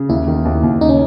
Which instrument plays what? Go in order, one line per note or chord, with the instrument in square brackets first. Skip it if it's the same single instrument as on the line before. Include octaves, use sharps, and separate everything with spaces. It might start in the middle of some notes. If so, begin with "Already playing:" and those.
Already playing: [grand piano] C#3
[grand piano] D#2 [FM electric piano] E4
[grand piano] D#3
D#2
D#2
[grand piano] C#3 [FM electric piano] D#4
[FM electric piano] C#4